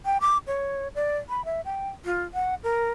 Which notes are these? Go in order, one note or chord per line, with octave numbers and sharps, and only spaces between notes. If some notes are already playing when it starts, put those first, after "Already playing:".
G5
D6
C#5
D5
B5
E5
G5
F4
F#5
A#4